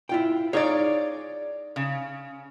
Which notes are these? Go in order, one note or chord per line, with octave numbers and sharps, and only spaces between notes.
E4 F4 G5
D#4 G#4 C#5 D5 F5
C#3